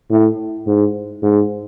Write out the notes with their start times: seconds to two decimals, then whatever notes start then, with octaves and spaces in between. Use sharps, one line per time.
0.11 A2
0.67 G#2
1.22 G#2